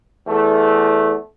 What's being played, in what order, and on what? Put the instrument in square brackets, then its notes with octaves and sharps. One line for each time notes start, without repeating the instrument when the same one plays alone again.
[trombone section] E2 A3